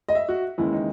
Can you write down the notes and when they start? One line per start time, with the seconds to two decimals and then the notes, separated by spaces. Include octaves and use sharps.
0.09 D#5
0.15 E5
0.29 F#4
0.58 D#2 C#3 E3 G#3 E4
0.73 D#4